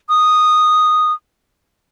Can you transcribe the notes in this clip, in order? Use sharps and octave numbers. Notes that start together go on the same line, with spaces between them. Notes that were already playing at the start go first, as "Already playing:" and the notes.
D#6